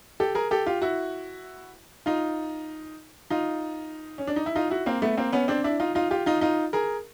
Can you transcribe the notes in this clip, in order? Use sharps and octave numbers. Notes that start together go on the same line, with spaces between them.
G4 A4
G#4 A#4
G4 A4
F4 G4
E4 F#4
D#4 F4
D#4 F4
C#4
D4
D#4
E4
D#4 F4
E4 F#4
A#3 C4
A3 B3
A#3 C4
B3 C#4
C4 D4
D4 E4
D#4 F4
D#4 F4
F4 G4
D#4 F4
D#4 F4
G#4 A#4